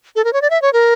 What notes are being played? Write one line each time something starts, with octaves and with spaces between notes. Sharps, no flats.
A4
A#4
C#5
D5
E5
C#5
A#4